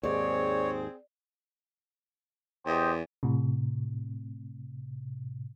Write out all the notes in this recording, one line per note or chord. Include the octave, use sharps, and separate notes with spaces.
D#2 G#2 C4 G#4 C#5 D5
E2 G4 C5 D#5
A2 C3